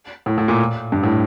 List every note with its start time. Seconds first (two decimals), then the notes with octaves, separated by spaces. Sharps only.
0.26 A2
0.38 A2
0.48 A#2
0.92 G2
1.03 A2